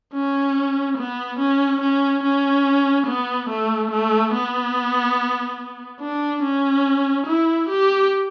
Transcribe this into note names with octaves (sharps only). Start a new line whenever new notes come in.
C#4
B3
C#4
C#4
C#4
B3
A3
A3
B3
D4
C#4
E4
G4